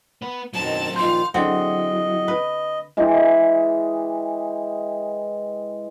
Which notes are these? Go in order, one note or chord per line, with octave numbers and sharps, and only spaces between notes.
B3 B4
F#2 B2 D#3 F#3 C4 A5
A#2 D#3 F3 F5 C6 G6
D3 F#3 C4 E4 G#4 D#5 F#5 G5
B4
E3 G#3 G4 G#4